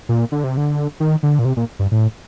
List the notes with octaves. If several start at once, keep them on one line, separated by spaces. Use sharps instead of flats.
A#2
D3
C3
D3
D#3
D3
A#2
C3
A#2
G2
A2